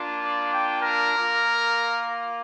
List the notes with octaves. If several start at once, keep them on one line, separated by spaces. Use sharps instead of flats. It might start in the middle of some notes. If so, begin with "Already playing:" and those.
Already playing: A#3 D4 F4
D5
G5
A#4
A#3 F4